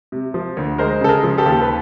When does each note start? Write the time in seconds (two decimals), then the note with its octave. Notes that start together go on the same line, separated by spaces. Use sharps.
0.12 C3
0.34 F3
0.57 D2
0.78 G#3 A#4 C5
1.01 C#3 A4
1.08 G#4 A#4
1.23 F3
1.38 G4 A4
1.46 D#2
1.62 B4